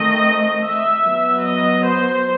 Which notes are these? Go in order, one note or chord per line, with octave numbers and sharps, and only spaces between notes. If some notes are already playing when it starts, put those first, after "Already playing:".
Already playing: D#3 A3 C4 D#5
E5
F#3 B3
D#5
C5